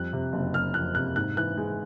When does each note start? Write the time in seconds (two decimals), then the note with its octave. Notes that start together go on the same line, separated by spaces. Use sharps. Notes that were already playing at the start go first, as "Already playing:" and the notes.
Already playing: F2 G3 F#6
0.13 C3
0.33 F#1
0.54 F#1 F6
0.74 F2 F#6
0.95 C3 F#6
1.16 G#2 F#6
1.37 E3 F#6
1.57 G#3